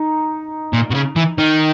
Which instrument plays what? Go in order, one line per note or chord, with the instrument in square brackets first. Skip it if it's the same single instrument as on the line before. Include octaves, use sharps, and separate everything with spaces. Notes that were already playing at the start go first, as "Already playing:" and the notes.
Already playing: [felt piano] D#4
[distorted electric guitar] A#2
B2
C#3
E3
D#3